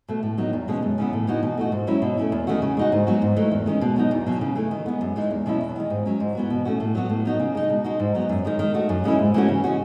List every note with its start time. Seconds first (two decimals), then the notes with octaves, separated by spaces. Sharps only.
0.08 B2 A3
0.23 A2
0.38 F#3 B3 D#4
0.53 E2
0.68 B2 G#3 C#4
0.83 F#2
0.98 C#3 E3 B3
1.13 A2
1.27 E3 B3 D#4 F#4
1.43 B2
1.57 A3 D#4 F#4
1.72 G#2
1.87 F#3 C#4 E4
2.02 B2
2.17 A3 C#4 E4
2.32 E2
2.47 D#3 A3 C#4 F#4
2.62 C#3
2.77 G#3 D#4 F#4
2.92 G#2
3.07 F#3 B3 D#4 F#4
3.22 G#2
3.37 E3 A3 D#4
3.51 E2
3.66 D#3 G#3 C#4
3.81 B2
3.96 F#3 B3 D#4
4.11 E2
4.27 B2 F#3
4.41 C#3
4.56 E3 A3
4.71 D#3
4.86 G#3 B3
5.01 F#2
5.16 E3 G#3 D#4
5.31 E2
5.46 B2 F#3 C#4 E4
5.61 E2
5.76 D#3 G#3
5.90 G#2
6.06 F#3 C#4
6.20 G#2
6.35 E3 B3 F#4
6.50 B2
6.65 A3 C#4 F#4
6.80 A2
6.95 F#3 B3 F#4
7.10 A2
7.25 F#3 B3 D#4 F#4
7.40 C#3
7.55 G#3 D#4
7.70 B2
7.84 G#3 D#4 F#4
8.00 G#2
8.15 F#3 B3 D#4
8.29 F#2
8.45 D#3 G#3 D#4
8.59 D#3
8.74 A3 D#4 F#4
8.89 F#2
9.04 C#3 G#3 C#4 E4
9.19 G#2
9.34 E3 A3 C#4 F#4
9.49 C#3
9.64 G#3 C#4 F#4